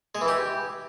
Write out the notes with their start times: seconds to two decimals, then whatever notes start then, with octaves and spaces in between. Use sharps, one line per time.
0.15 G#3
0.21 E3
0.28 G4